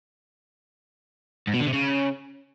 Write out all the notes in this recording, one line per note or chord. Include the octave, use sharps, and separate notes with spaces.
G#2
B2
D3
C3
C#3